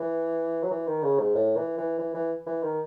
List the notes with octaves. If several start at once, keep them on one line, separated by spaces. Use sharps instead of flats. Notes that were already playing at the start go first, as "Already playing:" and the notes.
Already playing: E3
F#3
E3
D#3
C#3
G#2
A2
E3
E3
E3
E3
E3
D#3